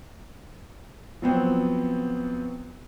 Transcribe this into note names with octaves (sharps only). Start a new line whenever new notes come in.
F3 F#3 B3 C4